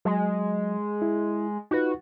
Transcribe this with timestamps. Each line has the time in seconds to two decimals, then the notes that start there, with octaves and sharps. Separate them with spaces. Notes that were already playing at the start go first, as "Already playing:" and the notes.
0.05 F#3 G#3
1.02 E4
1.71 D#4 F4 F#4 B4